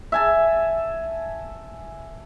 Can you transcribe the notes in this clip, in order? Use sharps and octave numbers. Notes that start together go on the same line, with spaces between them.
E5 G#5 A5